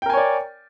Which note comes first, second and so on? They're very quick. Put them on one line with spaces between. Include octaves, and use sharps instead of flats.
G5 A#4 G#5 C#5 D5